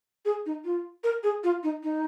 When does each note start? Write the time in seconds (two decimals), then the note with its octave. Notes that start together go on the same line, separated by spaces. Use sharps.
0.25 G#4
0.46 D#4
0.65 F4
1.04 A#4
1.23 G#4
1.44 F4
1.63 D#4
1.83 D#4